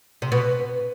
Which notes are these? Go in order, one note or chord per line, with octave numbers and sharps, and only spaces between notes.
C3
B2 B4